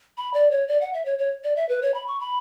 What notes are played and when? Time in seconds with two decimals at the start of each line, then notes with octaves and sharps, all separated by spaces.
0.17 B5
0.34 D5
0.51 C#5
0.68 D5
0.81 F#5
0.94 E5
1.05 C#5
1.19 C#5
1.44 D5
1.56 E5
1.69 B4
1.83 C#5
1.94 B5
2.08 C#6
2.20 B5